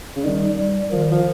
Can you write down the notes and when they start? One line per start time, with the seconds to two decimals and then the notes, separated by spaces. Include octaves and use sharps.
0.16 C#3
0.25 D#3 G3
0.58 G3
0.92 D#3 F3
1.12 F3